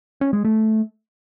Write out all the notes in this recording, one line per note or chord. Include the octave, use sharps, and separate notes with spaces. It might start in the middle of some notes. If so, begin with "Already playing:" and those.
C#4
G#3
A3